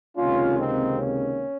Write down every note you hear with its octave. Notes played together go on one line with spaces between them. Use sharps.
C#2 C3 D#3 A#3 C#4 F4
C4 D#4
C#4